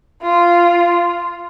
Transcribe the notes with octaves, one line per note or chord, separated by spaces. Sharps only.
F4